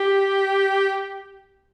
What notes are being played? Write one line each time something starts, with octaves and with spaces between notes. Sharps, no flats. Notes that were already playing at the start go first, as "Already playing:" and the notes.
Already playing: G4